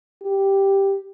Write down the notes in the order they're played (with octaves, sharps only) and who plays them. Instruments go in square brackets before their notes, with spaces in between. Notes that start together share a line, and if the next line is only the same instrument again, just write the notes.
[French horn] G4